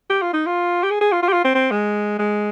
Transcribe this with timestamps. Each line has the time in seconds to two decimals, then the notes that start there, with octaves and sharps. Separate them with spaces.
0.10 G4
0.22 F4
0.33 D#4
0.46 F4
0.83 G4
0.91 G#4
1.01 G#4
1.12 F4
1.23 F4
1.28 G4
1.33 F4
1.45 C4
1.55 C4
1.71 G#3
2.19 G#3